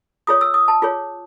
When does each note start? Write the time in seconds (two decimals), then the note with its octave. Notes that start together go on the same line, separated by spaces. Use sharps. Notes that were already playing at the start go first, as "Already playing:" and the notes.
0.27 F4 G#4 C#5 D#6
0.41 E6
0.54 D#6
0.68 A5
0.82 F4 G#4 C#5